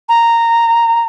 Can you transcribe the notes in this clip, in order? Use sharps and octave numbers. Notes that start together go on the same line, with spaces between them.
A#5